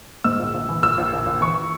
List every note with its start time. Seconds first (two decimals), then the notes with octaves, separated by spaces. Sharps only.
0.24 G#2 E6
0.39 A#1
0.54 A#1
0.69 E3
0.82 A#1 E6
0.98 A#1
1.13 A#1
1.26 A#1
1.41 E3 C#6